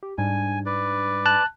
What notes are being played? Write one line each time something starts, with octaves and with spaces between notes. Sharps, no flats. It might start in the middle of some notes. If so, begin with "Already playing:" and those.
G4
G#2 G3 D4 G#5
B4 D5
A5 F#6